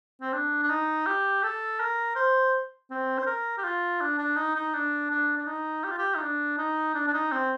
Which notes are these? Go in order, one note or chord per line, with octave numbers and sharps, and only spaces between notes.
C4
D4
D4
D#4
G4
A4
A#4
C5
C4
C5
A#4
G4
F4
D4
D4
D#4
D#4
D4
D4
D4
D#4
G4
F4
G4
D#4
D4
D#4
D4
D4
D#4
C4